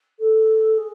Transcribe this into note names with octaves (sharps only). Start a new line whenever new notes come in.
A4
G#4